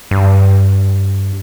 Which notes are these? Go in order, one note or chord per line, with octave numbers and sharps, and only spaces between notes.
G2